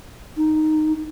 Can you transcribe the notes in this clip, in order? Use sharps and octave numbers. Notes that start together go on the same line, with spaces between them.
D#4